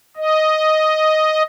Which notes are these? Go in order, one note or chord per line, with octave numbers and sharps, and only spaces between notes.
D#5